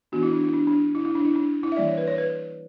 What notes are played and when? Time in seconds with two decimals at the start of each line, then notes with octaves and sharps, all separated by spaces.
0.12 E3 B3 D4 F#4
0.23 E4
0.33 D4
0.44 E4
0.54 D4
0.67 D4
0.95 E4
1.05 E4
1.15 D4
1.25 E4
1.36 D4
1.63 E4
1.72 E5
1.77 E3 G3 A#3 D5
1.87 C#5
1.98 B4
2.07 C#5
2.18 B4